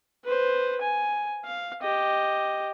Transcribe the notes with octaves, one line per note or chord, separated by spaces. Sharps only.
B4 C5
G#5
F5
G4 D#5